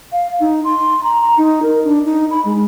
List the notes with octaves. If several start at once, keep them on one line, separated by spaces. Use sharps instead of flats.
F5
D#4
C6
A#5
A#5
D#4
A#4
D4
D#4
B5
G#3